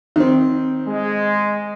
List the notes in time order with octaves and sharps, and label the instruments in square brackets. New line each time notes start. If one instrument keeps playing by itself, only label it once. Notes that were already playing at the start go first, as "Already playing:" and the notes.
[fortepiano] D#3 C4
[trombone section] G#3